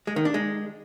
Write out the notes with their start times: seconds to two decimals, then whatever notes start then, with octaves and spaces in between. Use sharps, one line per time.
0.07 G#3
0.16 D#3
0.25 D4
0.34 G#3